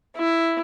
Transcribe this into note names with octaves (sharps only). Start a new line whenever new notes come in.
E4